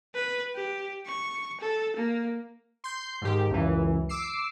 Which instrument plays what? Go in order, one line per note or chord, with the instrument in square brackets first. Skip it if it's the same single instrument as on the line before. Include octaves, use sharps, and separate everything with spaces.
[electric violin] B4
G4
C#6
A4
A#3
[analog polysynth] C6 G6
G#2 D#3 G4
C#2 F#2 E3
D6 E6 C7